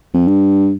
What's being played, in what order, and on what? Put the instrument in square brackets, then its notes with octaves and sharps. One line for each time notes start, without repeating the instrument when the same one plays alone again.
[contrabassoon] F2
G2